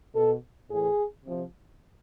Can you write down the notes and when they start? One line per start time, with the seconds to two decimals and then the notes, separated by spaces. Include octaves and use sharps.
0.15 B2 A4
0.70 A2 E3 G#4
1.24 C3 F3